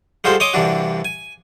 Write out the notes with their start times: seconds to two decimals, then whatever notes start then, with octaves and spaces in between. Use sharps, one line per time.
0.24 G3 G#3 F4 F#4 A4 C5
0.40 C#5 D#5 G#5 C6 D6 D#6
0.54 C2 G2 E3 D4 F#4
1.05 G#5